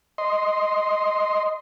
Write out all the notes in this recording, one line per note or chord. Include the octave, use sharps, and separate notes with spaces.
D#5 C6